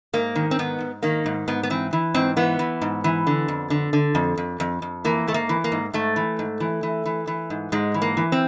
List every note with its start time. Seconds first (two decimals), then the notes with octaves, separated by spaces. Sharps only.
0.13 G#2 A#3
0.35 D#3
0.51 C4
0.59 G#2 B3
0.80 G#2
1.03 D#3 A#3
1.26 G#2
1.48 G#2 B3
1.63 B3
1.70 E3 C4
1.93 E3
2.14 G#2 C4
2.37 E3 B3
2.59 E3
2.81 G#2
3.04 E3
3.27 D3
3.48 F2
3.70 D3
3.93 D3
4.15 F2
4.37 F2
4.60 F2
4.82 F2
5.05 E3 A#3
5.27 G#2 A3
5.34 A#3
5.49 E3
5.64 A#3
5.72 G#2
5.93 G#2 A3
6.16 E3
6.39 G#2
6.60 E3
6.83 E3
7.06 E3
7.27 E3
7.50 G#2
7.72 G#2 G#3
7.94 E3
8.02 A#3
8.17 E3
8.32 C4